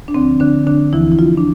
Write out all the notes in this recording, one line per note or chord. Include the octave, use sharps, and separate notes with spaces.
D4
D2 D3 F3 C4
D3 D4
D3 D4
D2 D3 E3 F3 E4
E4
F3 F4
D4